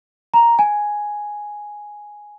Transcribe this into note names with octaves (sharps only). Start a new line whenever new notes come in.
A#5
G#5